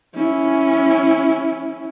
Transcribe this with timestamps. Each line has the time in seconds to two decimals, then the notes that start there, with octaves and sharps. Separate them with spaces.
0.15 C#4 E4